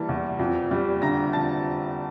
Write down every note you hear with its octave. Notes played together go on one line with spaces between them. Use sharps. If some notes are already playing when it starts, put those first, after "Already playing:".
Already playing: E3 G3 A#3 A5
E2
F2
G3
D3 A#5 A#6
F2 A5 A6